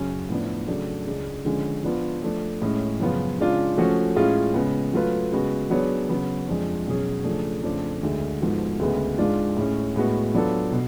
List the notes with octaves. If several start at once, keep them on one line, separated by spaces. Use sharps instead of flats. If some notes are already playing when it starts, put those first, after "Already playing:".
Already playing: F#2 C#3 F#3 C#4
A2 F3 B3 D4
C#3 F#3 A3 D4
C#2 C#3 G#3 D4
D3 F3 G#3 C#4
F3 B3 D4 F4
F3 A3 D4
A2 G#3 C#4 G#4
F#2 C#3 F3 B3 F4
C#3 G#3 D4 F4
F3 A3 C#4 F#4
A2 G#3 C#4 F4 G#4
C#3 G#3 B3
F#3 A3 F4 B4
C#3 G#3 B3 F#4
F#3 B3 D4 G#4 C#5
C#3 F#3 B3
F2 F3 G#3 D4 G#4
B2 F#3 C#4 G#4
C#3 F3 A3 D4 G#4
F2 C#3 F3 A3 D4
D2 D3 G#3
G#2 F3 B3 F#4 A4
D2 C#3 G#3 B3
G#2 G#3 D4 F4
A2 G#3 C#4
A2 G#3 B3 F#4
F#3 B3 D4 F4 A4
B2